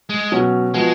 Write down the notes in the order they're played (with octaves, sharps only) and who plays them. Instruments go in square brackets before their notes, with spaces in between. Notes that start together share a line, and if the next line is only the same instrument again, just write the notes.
[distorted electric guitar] G#3
[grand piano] B2 F#3 C#4 F#4
[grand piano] F3 B3 F#4 [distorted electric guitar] G#3